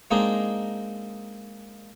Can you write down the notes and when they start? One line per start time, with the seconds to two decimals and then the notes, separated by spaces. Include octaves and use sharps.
0.11 G#3 A#3 C4 D4 D#4 G#4